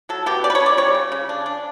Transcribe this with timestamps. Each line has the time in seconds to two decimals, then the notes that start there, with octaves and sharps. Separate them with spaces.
0.09 F#3 A4
0.26 B2 G4
0.44 C#4 D5
0.50 B4
0.55 C#5
0.61 C#4
0.66 D5
0.78 G3 C#5
0.95 C#3
1.12 C#3
1.29 D4
1.46 D4